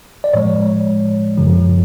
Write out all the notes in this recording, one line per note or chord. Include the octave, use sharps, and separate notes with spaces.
D5
A2 F3 G#3 C#5
F#2 C#3 F3